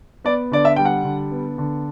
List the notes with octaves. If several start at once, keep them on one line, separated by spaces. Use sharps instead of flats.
B3 D5
D3 D5
E5
G3 G5
F#5
D3
B3
D3